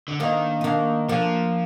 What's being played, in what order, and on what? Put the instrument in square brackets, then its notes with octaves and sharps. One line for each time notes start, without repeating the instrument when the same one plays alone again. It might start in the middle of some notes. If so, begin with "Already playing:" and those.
[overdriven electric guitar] D3
[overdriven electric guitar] D#3 [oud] A#3 D4
[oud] D#4
A#3 D4
[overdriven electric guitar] F3 [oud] A#3 D4